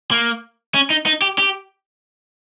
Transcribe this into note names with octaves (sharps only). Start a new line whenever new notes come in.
A#3
C#4
D#4
D#4
G4
G4